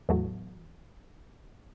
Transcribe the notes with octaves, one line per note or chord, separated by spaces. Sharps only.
E2 A2 F#3